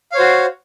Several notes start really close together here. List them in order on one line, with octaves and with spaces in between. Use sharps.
F5 C#5 C5 F#4